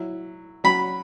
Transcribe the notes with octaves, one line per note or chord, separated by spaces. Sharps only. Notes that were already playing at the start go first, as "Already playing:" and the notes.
Already playing: F#3 E4
F#3 C#4 F#4 B5